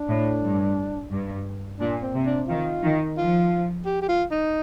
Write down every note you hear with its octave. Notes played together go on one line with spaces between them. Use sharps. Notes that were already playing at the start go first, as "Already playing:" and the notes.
Already playing: D4
A2
G2
G2
A#2 D4
C4
C3
D4
D#3 F4
D#3
F3 F4
G4
G4
F4
D#4